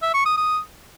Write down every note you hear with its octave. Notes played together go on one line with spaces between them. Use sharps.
E5
C#6
D#6
D#6